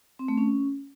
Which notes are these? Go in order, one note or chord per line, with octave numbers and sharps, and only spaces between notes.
C4
A3
C#4